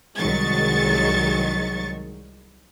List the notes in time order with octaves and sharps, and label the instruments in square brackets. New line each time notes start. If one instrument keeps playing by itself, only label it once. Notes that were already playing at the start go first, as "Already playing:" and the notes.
[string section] C2 D#3 F#3 G#3 C#6 A6